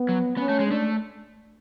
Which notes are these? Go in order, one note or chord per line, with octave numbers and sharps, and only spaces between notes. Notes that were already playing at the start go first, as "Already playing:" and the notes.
Already playing: B3
F#3
B3 C#4
A3
G#3
D4
A3